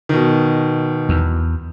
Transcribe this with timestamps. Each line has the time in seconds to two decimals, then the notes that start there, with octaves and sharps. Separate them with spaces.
0.09 B2 D#3
1.09 E2